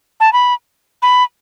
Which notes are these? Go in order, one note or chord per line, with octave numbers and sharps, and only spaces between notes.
A5
B5
B5